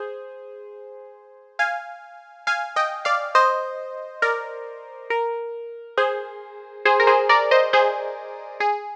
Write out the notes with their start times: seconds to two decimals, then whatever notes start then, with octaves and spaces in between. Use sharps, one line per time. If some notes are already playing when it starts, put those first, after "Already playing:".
Already playing: G#4 C5
1.59 F5 G#5
2.47 F5 G#5
2.76 D#5 G5
3.05 D5 F5
3.35 C5 D#5
4.22 A#4 D5
5.10 A#4
5.98 G#4 C5
6.85 G#4 C5
7.00 A#4
7.07 G#4 C5
7.29 A#4 D5
7.51 C5 D#5
7.73 G#4 C5
8.60 G#4